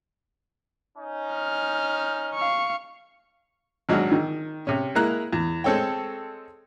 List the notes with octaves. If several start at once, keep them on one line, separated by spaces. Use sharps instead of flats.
C#4 D#4
F6
F5 C#6
G#1 F#3 G#3 D4 F#5 F6
D#3
C3 C#4
G#3 A#3 E4 A#5 F#6
E2
G#3 C4 A4 C#5 G5